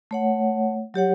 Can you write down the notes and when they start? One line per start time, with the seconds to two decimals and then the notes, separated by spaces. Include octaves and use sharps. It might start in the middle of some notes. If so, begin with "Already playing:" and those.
0.11 A3 C#5 F#5
0.94 F#3 G4 C#5 F#5